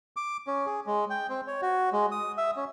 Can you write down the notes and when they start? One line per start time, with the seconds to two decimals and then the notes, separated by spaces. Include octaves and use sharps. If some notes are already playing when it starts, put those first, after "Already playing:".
0.16 D6
0.47 C#4
0.66 G#4
0.87 G#3
1.10 G5
1.29 C4
1.47 C#5
1.62 F#4
1.93 G#3
2.12 D#6
2.37 E5
2.56 C#4